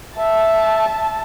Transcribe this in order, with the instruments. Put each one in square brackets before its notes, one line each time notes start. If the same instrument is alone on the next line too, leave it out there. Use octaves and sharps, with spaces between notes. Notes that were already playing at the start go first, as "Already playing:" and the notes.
[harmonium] E5 [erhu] A5